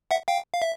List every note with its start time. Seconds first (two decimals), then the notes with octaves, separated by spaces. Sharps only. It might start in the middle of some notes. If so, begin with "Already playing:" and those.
0.11 E5 F#5
0.28 F5 G5
0.53 F5
0.62 E5